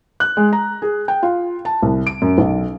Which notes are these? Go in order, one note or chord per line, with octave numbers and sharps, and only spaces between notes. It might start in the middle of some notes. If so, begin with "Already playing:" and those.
F#6
G#3
A#5
G#4
G5
F4
A5
C2
D7
F#2
B1